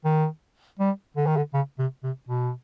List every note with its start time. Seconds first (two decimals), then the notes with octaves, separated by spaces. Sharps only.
0.04 D#3
0.79 G3
1.17 D3
1.26 D#3
1.37 D3
1.53 C#3
1.79 C3
2.04 C3
2.28 B2